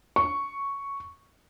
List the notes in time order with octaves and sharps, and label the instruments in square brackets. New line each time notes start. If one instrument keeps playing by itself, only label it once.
[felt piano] C#6